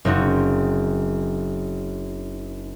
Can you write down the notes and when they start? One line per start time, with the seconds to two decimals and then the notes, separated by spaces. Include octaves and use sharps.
0.05 F#1 C4 D#4 F#4